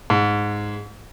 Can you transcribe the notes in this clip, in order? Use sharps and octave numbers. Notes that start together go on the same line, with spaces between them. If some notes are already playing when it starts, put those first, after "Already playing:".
G#2